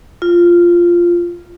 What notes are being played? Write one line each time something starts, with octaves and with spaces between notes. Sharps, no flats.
F4